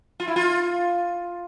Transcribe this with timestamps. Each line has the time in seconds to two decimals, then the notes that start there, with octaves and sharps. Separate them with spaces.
0.20 F4
0.28 E4
0.36 F4